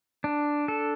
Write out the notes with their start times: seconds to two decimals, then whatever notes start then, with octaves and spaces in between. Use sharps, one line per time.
0.24 D4
0.68 A4